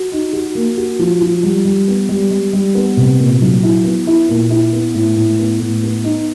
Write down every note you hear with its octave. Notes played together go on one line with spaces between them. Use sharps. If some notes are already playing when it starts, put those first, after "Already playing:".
Already playing: F#4
D#4
F#4
A#3
F#4
F3
F3
G3
G3
B3
G3
G3
G3
B3
C3
A#2
F#3
E4
B3
E4
A#2
E4
B3
A2
A2
B3
A2
B3
D#4